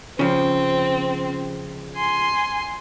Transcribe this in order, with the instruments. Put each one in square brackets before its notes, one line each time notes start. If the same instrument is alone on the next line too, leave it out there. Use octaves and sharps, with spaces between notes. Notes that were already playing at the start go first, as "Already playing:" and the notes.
[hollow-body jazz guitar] C#3 F3 [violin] C4
[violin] G#5 C6